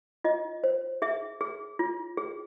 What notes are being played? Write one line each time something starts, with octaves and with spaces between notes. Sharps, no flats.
F4 D#5
C5
G#4 E5
G#4
F4
G#4